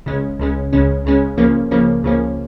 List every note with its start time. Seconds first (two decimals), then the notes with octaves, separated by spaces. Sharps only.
0.06 C#2 C#3 G#3 C#4
0.39 C#2 C#3 G#3 C#4
0.73 C#2 C#3 G#3 C#4
1.05 C#2 C#3 G#3 C#4
1.37 C#2 C#3 F3 A#3 C#4
1.71 C#2 C#3 F3 A#3 C#4
2.03 C#2 C#3 F3 A#3 C#4